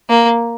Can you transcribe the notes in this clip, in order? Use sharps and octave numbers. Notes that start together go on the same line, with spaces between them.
A#3